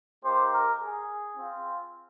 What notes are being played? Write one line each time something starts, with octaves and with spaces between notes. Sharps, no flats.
A#3 D#4 G4 C5
A#4
G#4
C4 F4